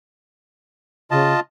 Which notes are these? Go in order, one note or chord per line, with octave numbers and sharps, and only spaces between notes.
C#3 F4 D#5 A5